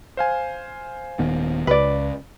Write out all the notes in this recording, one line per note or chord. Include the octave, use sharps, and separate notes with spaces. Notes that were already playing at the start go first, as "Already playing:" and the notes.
C5 F5 G#5
D#1 D#3 B3
C#2 B4 D5